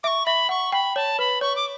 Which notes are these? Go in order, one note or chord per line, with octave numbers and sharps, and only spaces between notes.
E5 C#6 D6
E5 B5
F#5 C#6
G5 B5
C#5 A5
B4 B5
C#5 C#6
D6